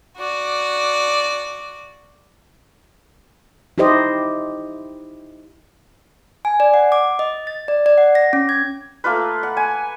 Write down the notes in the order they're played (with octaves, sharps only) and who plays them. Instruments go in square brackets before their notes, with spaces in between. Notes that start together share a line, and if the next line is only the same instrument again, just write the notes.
[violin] F#4 D5
[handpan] D#4 E4 G4 C5 D#5
[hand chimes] G#5
D5
F#5
D6
D#5
A6
D5
D5
F#5
A#6
C#4
G#6
[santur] A3 A#3 F4 B4
F#5
G#5